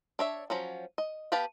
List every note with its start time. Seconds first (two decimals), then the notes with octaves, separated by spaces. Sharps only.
0.19 D4 C#5 E5
0.50 F3 F#3 C#4
0.98 D#5
1.32 B3 G4 B4 F5 A5